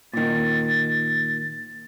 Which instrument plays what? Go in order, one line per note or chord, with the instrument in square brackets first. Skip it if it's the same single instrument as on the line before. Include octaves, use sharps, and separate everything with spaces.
[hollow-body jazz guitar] A#2 D#3 [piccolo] A6